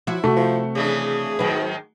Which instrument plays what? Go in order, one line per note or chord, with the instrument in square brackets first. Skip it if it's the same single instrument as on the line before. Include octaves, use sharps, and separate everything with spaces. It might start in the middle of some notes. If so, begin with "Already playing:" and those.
[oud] F3 F#4 C#5 [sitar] E4
[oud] C3 [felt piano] A3 F#4
[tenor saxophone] F3
[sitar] C#3 E3 D4 [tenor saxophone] G#4
[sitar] G#2 D#3 [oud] F#3 B4